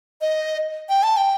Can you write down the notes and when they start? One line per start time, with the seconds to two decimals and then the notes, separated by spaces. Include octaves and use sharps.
0.21 D#5
0.89 G5
1.03 A5
1.17 G5